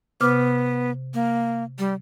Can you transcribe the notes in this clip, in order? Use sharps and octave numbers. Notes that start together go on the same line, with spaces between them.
C3 B3 D6 F6
A#3
G3